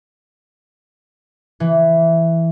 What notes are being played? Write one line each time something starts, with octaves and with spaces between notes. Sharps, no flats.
E3